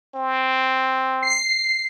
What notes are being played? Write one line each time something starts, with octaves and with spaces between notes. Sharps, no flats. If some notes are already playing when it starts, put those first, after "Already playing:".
C4
C7